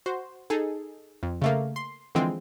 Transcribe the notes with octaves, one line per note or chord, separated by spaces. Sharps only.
F#4 C5
D#4 G#4 A4
F2
C#3 A3 A#3
C6
D3 E3 F3 G#3 C4